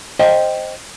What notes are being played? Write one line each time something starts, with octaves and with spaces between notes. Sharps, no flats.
C5 D#5 G5